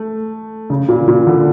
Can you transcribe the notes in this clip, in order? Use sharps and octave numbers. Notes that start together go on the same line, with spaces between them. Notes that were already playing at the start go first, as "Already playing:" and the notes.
Already playing: A3
C#3
A#2
A#2
D3